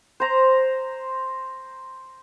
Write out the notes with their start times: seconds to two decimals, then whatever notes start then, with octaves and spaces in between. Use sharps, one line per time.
0.20 C5 A#5